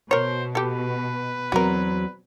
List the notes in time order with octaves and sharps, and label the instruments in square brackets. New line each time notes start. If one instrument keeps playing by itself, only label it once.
[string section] B2 [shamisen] A#4 C#5 [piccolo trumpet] C5
[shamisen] G4 A4 [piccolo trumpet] B4
[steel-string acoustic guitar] E2 F#3 C4 [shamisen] F#4 A#4